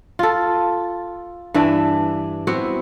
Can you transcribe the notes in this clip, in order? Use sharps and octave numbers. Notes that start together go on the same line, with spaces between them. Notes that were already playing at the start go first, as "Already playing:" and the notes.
F4 A4
G2 E3 D4 E5
B3 C4 E4 F#4